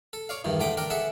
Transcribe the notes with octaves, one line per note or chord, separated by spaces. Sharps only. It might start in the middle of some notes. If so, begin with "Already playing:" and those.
A4
C#5 D5 F5
E2 G2 D#3
A2 D3 G5 B5 D6 D#6
D4 A#4 G5
G#4 A4 E5 F#5 A5